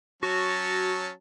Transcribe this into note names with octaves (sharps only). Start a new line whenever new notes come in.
F#3 C#4 F#4 A5